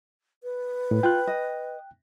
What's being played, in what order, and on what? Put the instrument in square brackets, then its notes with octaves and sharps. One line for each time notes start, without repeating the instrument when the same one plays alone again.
[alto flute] B4
[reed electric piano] A2
[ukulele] F4 [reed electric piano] G5 F#6
[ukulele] D#5